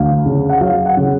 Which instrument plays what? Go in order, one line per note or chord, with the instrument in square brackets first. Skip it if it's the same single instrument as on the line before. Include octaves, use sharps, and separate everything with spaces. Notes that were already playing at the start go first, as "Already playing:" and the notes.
Already playing: [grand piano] D2 F5
C#3
F#5
F#3 F5
F#5
C#3